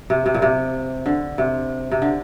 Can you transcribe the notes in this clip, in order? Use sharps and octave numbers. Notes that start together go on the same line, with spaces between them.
C3
C3
A#2
C3
D3
C3
C3
D3